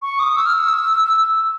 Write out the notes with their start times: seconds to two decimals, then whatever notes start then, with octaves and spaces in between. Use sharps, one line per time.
0.02 C#6
0.20 D#6
0.36 E6
0.46 F6
0.53 E6
1.05 E6